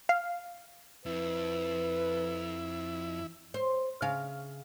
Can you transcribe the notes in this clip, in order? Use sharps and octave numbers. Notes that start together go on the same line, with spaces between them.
F5
F2 E4 B4
C5
C#3 F5